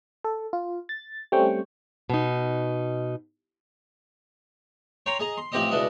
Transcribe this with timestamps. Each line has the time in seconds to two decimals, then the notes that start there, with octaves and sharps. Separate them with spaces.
0.24 A4
0.53 F4
0.89 A6
1.32 G3 A3 C4 C#4 G5 C#6
2.10 B2 D#4
5.06 C#5 G5 A#5 C6
5.19 G#4 D#5 A#5
5.38 C6
5.52 A1 F3 C4 G4 D#5 D#6
5.71 C#2 B2 D4 E4 D#5